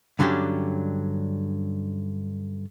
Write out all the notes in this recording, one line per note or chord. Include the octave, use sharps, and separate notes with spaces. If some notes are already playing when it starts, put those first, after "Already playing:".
G2 D3 F#3 C#4 D4 G4